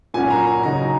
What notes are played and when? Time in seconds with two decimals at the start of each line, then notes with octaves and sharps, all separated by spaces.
0.14 A#2 F#3 C#4 F#4 G#5
0.30 A#5
0.47 A#5
0.63 C#3 F#3 D#4 F#4 A#5